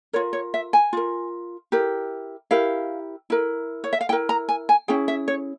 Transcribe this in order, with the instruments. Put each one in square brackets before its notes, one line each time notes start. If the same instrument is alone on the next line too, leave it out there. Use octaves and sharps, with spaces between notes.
[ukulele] F4 A#4 C#5
C#5
E5
G#5
F4 A#4
E4 G4 A#4
E4 G4 A#4 F5
E4 A#4
C#5
E5
F5
E4 A#4 G5
A#5
G#5
G#5
C#4 E4 G#4 G5
E5
C#5